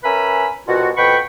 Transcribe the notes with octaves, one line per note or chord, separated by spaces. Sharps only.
C#4 A#4 B4 E5 G#5 B5
C2 B2 F4 F#4
F2 B2 B4 G5 B5 C#6